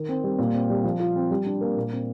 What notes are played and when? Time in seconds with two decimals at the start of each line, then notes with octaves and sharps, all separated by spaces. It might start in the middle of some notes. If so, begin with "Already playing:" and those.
Already playing: D#3
0.09 C4
0.24 G3
0.39 A#2
0.54 C4
0.70 G3
0.84 F3
1.00 F4
1.15 C4
1.31 G3
1.46 D4
1.61 A#3
1.76 A#2
1.92 C4